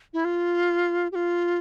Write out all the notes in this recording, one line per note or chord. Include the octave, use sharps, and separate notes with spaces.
E4
F4
G4
F4